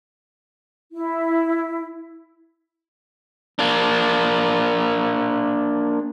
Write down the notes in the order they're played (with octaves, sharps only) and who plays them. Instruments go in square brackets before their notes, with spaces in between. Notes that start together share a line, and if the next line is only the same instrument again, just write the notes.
[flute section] E4
[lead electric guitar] A#3 D4